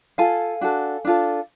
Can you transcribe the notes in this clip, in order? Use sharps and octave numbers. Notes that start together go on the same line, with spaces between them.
F4 A4 F5 G#5
D4 F#4 A4
D4 F4 A4